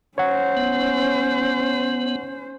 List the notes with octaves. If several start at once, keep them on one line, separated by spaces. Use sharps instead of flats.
C#4 C5 C#5 F#5
B3